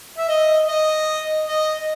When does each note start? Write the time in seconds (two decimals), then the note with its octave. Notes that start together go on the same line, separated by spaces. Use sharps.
0.18 E5
0.28 D#5
0.68 D#5
1.48 D#5